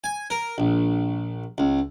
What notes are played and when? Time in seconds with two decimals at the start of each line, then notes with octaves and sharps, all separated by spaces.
0.04 G#5
0.30 A#4
0.58 A#1
1.58 C#2